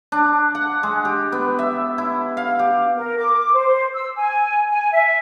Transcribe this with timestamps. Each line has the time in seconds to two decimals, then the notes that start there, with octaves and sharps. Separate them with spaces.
0.12 D4
0.55 F#5
0.83 G#3
1.05 G4
1.32 B3
1.59 E5
1.98 E4
2.37 F5
2.59 G4
2.97 A#4
3.17 D6
3.54 C5
3.93 E6
4.16 G#5
4.69 G#5
4.92 E5